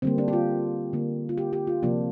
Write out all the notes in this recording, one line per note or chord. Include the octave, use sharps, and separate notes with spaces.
D3 G3 A#3 C4
D4
G4
F4
D3 A#3
F4
G4
G4
F4
C3 F3 A#3 D4